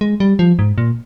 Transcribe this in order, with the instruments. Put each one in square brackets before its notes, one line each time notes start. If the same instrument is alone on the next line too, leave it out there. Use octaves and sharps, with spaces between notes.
[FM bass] G#3
G3
F3
G#2
A#2